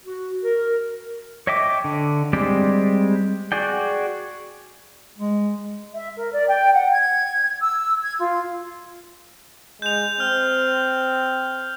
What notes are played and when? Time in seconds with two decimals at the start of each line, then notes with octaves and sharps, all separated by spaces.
0.05 F#4
0.44 A#4
1.47 C#5 D#5 E5 G5 D6
1.84 D3
2.33 G3 G#3 C4 G4 D5
3.52 F#4 G#4 D5 G5
5.18 G#3
5.94 E5
6.17 A#4
6.33 D5
6.48 G5
6.72 F#5
6.91 G#6
7.60 E6
8.03 G#6
8.19 F4
9.82 G#3 G6 F7
10.20 C4 F6